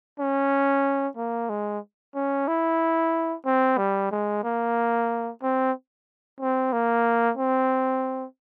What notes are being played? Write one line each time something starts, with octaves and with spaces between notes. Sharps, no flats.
C#4
A#3
G#3
C#4
E4
C4
G3
G#3
A#3
C4
C4
A#3
C4